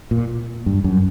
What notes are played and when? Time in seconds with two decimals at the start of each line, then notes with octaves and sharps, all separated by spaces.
0.11 A#2
0.66 G2
0.84 F#2